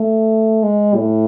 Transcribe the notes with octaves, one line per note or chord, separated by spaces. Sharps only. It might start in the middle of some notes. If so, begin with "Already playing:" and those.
Already playing: A3
G#3
A2